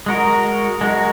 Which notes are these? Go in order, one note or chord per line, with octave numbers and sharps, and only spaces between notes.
G#3 F#4 A#4
G#3 F#4 A#4